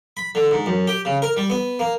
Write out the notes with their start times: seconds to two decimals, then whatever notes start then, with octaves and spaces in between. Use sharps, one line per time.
0.17 B5
0.35 D3
0.51 G#2
0.66 F#2
0.87 G4
1.05 C#3
1.22 A#4
1.36 G3
1.50 B3
1.79 A#3